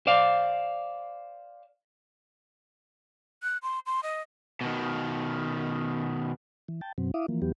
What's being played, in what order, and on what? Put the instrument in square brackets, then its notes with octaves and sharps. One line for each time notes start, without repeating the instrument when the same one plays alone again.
[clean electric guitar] C5 D5 F5
[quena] F#6
C6
C6
D#5
[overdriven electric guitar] B2 D#3
[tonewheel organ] E3
G5 A5
F#2 B2 F#3 C4
E4 E5 F5 D6 D#6
E3 F3 A#3
E2 E3 F#3 B3 G4